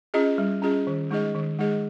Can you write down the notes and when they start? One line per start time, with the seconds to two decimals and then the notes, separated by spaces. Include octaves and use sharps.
0.14 C#4 F4 G#4 D#5
0.38 G3
0.62 C#4 F4 G#4 D#5
0.87 D#3
1.11 G#3 D#4 G#4 D#5
1.35 D#3
1.59 G#3 D#4 G#4 D#5